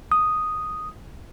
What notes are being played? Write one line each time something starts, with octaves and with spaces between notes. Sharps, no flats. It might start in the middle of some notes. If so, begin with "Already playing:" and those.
D#6